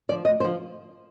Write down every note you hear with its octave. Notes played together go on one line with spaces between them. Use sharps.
D3 F3 D5
D2 D#5
D3 F3 C5